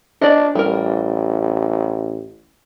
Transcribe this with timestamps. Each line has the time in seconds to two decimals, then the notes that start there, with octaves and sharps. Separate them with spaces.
0.22 D4 D5 D#5
0.55 A1 G3 A#4